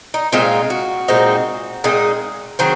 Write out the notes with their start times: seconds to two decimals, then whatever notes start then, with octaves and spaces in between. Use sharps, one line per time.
0.14 D#4
0.32 A#2 G#3 C4 D#4 F4
0.70 F#4
1.08 A#2 G#3 C4 D#4
1.84 A#2 G#3 C4 D#4
2.59 D#3 F#3 C4 G#4